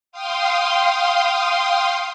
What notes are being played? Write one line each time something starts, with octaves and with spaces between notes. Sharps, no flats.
F5 G5 C6 D#6